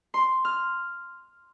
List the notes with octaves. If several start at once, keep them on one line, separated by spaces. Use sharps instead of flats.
C6
F6